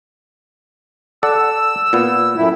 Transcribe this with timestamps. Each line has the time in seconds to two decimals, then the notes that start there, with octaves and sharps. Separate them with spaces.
1.23 A4 D5 F#5 E6
1.93 A#2 B3
2.37 F#2 A2 E4